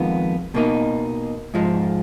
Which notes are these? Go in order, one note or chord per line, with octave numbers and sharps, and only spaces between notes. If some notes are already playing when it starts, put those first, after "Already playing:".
Already playing: F2 D#3 G#3 B3 F4
B2 A#3 D#4
G#2 F3 G#3